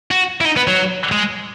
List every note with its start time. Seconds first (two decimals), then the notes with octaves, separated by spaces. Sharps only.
0.11 F#4
0.41 E4
0.45 D#4
0.57 B3
0.68 F#3
1.12 G#3